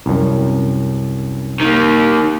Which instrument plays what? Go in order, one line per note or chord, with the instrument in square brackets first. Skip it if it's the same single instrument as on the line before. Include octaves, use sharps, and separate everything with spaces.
[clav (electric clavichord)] C2 F#2
[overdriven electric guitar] D#3 A#3